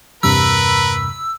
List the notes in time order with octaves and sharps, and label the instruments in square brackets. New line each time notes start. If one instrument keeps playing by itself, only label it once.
[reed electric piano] E2 G2 C3 [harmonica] A#4 B4 [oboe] B5 [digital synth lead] E6